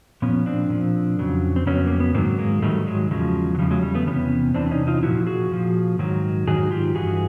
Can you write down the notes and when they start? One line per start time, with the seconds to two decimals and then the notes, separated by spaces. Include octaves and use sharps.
0.22 A#2 F3 B3 C#4
0.46 C4 D4
0.70 A#2 F3
1.19 F2 C#3 F#3
1.56 C4
1.66 F2 C#3 F#3 B3 C#4
1.87 A#3
2.00 B3
2.14 G#2 D#3 F#3 A#3 C4
2.39 G#3 A#3
2.62 G#2 D#3 F#3 G3 A3
2.87 F#3 G#3
3.10 E2 C#3 F3 F#3 G#3
3.55 F#3
3.59 E2 C#3 F3 G3
3.71 F#3 G#3
3.83 G3
3.95 A3 B3
4.07 E2 C3 E3 B3 C#4
4.54 E2 C3 E3 C4 D4
4.71 C#4 D#4
4.87 D#4 F4
5.03 A#2 F3 E4 F#4
5.27 F#4 G#4
5.51 A#2 F3
5.99 G#2 D#3 F#3
6.47 G#2 D#3 F#3 F#4 G#4
6.71 F4 G4
6.95 G2 E3 F#4 G#4